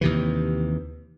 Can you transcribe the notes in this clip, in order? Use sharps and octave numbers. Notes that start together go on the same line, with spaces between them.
D#2 C3 E3